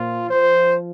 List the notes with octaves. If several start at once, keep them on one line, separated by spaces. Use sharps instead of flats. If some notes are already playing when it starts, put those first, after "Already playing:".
Already playing: A#2 F3 F4
F3 C5